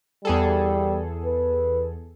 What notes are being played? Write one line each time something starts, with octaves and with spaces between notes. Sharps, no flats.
E2 G3 G#4 A4
B4